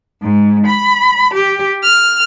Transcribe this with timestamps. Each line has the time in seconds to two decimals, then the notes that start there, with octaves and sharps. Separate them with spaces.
0.22 G#2
0.65 B5
1.33 G4
1.83 F6